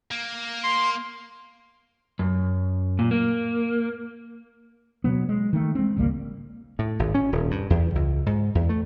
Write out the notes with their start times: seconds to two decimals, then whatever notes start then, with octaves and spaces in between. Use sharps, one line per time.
0.11 A#3
0.63 C6
2.19 F#2
2.99 A#2
3.11 A#3
5.04 B2 F#3 B3
5.29 G#3
5.53 D#3 A3
5.75 G#3 C4
5.97 G#1 C#2 G3 A#3
6.79 A2
6.99 G#1
7.15 C#4
7.32 D#1
7.51 G2
7.70 E2
7.95 C#2
8.26 G#2
8.55 E2
8.69 A3